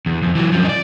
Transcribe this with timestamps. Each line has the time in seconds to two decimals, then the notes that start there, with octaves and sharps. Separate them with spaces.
0.06 E2
0.22 F2
0.35 E3 F#3
0.52 F#2 F3
0.65 D5 D#5